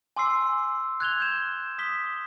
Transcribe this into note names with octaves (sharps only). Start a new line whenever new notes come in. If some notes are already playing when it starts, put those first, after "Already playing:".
G#5 C6 D6 E6 C7
F#6 G#6 F7 G7
G6 E7
D#6 B6 G7